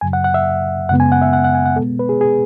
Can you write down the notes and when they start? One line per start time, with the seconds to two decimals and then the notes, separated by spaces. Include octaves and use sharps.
0.01 F#2 C#3 F#3 G#5
0.13 F#5
0.24 F#5
0.34 E5
0.89 F#2 C#3 G#3 B3 F#5
1.00 G#5
1.12 F#5
1.22 E5
1.33 F#5
1.44 F#5
1.55 G#5
1.66 F#5
1.76 B2 G#3 B3 A4
1.99 B4
2.09 G#4
2.21 G#4